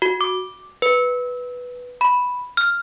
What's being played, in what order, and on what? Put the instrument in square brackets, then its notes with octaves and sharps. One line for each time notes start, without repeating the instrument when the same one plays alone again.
[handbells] F#4
D6
B4
B5
F6